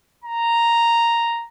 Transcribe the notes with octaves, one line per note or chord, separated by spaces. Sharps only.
A#5